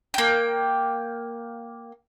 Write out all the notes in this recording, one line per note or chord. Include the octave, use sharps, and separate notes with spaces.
A#3 G5